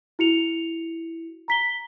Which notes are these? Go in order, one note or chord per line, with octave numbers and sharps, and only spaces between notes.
E4 F#4 C#7 F7
A#5 B6 G7